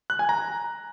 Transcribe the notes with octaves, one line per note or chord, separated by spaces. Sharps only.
F#6
G#5
A#5